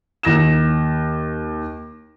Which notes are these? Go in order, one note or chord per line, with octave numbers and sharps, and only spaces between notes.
D#2 A#6 E7